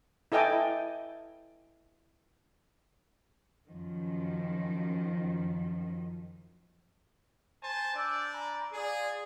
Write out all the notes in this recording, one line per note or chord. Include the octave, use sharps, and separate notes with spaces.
E4 A4 D#5 G5 G#5 D6
F#2 D#3 F3
C5 G#5 A5
D4 D5 E6 G6
G#5 A#5 B5
F4 G#4 D5